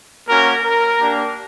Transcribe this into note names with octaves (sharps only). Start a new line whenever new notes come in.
A#3 C#4 F#4 A#4
A#4
A#3 D4 G4